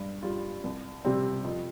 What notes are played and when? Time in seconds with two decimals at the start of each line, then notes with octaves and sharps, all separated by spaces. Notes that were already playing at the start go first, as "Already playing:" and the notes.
Already playing: G2
0.23 G3 F4
0.64 C2
1.05 C3 G3 C4
1.44 F2